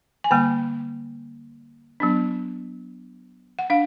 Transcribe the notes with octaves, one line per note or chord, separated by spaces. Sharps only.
G#5
D3 G3 A#3 G5
F#3 B3 D4
F#5
D4 F5